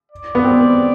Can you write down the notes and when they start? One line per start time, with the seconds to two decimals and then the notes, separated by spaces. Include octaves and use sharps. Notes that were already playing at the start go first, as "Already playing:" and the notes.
0.12 D5
0.35 B3
0.44 C4